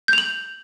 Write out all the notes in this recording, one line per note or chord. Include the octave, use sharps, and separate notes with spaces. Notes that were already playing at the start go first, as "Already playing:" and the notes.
G6 F7 F#7